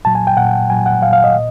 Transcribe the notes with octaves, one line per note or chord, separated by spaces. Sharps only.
A#2 F#3 A5
G#5
G5
A#2 F#3 F#5
A#2 F#3 G#5
F#5
A#2 F#3 F5
F5
D#5
A#2